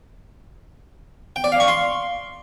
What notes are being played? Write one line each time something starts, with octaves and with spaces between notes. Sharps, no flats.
G5
D5
F5
C#6
C6